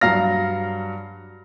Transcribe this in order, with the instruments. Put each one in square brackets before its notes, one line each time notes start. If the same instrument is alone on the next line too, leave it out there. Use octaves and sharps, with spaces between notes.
[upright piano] G2 F#3 F5 A#5 F6 A#6